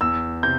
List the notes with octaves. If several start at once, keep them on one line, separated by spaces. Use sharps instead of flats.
E2 E6
C3 G6